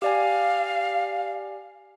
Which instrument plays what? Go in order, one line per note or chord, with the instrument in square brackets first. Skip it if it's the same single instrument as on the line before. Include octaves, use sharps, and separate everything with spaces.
[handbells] G4 D5 G#5 [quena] F5